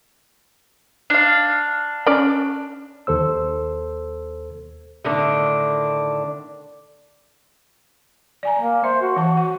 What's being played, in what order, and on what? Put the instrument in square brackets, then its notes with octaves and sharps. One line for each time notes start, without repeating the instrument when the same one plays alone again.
[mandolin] D4 F5
[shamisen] C#4 D5
[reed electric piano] D#2 A4 C5 E6
[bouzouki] A2 D3 D#3 D4
[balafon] D5 G#5 A#5
[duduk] A#3
[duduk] C5 [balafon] E5
[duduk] F#4
[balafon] E3 A5
F#5